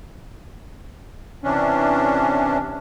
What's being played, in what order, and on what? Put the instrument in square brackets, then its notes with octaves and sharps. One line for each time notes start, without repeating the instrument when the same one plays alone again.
[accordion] C3 E3 C#4 D4